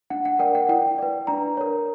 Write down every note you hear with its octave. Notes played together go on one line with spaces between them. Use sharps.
D4 F#5
F#5
A#4 D5 G5
F#5
E4 G5
B4 D5
D4 A#5
A#4 C#5